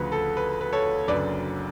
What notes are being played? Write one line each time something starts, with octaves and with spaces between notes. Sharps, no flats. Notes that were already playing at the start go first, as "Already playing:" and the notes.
Already playing: D2 C#3 F3 B4
A4
B4
B4
A4 C#5
F#1 F#2 D3 B4 D5